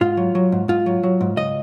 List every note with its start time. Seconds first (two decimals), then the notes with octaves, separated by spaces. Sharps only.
0.01 G#2 F4
0.17 F#3
0.35 F#3
0.52 G#2
0.68 G#2 F4
0.86 F#3
1.03 F#3
1.21 G#2
1.37 C#2 D#5